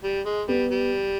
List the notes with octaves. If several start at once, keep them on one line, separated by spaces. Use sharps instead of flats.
G3
G#3
G3 B3
G3